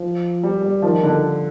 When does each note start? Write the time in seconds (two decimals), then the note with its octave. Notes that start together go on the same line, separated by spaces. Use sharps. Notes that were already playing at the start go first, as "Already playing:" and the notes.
Already playing: F3
0.43 G3
0.62 G3
0.82 D#3 F3
1.03 D3